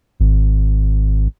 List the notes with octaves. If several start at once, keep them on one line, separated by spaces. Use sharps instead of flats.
G#1